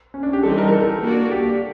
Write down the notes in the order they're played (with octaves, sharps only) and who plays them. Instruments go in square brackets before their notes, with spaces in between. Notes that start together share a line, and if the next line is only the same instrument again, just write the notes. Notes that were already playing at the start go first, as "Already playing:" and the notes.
[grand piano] C#4
D4
G4
[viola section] E3 G3 C4 D#4 [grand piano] A4
[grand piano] A#4
A#4
A4
[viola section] A#3 D4 F#4 A4 D5
[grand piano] G4